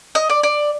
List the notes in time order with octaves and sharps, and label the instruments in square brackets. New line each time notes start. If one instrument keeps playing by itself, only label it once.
[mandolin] D#5
D5
D5